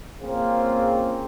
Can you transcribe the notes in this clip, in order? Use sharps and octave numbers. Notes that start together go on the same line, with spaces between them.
A#3 C4 C#4 F4 G#4